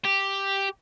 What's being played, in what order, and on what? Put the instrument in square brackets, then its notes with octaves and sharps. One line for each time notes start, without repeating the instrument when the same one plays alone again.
[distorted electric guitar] G4